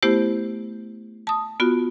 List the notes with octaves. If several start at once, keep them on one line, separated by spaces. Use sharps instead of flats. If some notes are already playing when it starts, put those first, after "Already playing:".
A3 B3 E4 G4 C5
A5 D#6
B3 F4 F#4